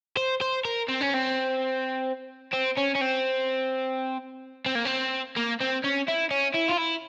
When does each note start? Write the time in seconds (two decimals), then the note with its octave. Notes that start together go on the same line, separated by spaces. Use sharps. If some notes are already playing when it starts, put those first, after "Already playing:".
0.17 C5
0.41 C5
0.65 A#4
0.88 C4
1.01 C#4
1.14 C4
2.53 C4
2.77 C#4
2.95 C#4
3.01 C4
4.66 C4
4.75 A#3
4.85 C4
5.36 A#3
5.60 C4
5.84 C#4
6.08 E4
6.31 C#4
6.55 E4
6.69 F4
6.78 E4